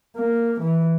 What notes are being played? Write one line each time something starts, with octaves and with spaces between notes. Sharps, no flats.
A#3
E3